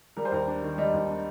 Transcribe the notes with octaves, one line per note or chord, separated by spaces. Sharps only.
G3 A#4
C5
D#2 A#4
D4
D#3
G3 D#5
D#2
D4